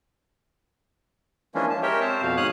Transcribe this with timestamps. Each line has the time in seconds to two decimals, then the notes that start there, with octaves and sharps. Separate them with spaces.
1.55 E3 F3 G#3 A#3 C#4 D4
1.70 A5
1.82 G#3 G4 A#4 C#5 E5 G5
2.01 C4 C5 A5
2.22 F2 B2 F5
2.37 G#2 C#5 F5 D#6 F#6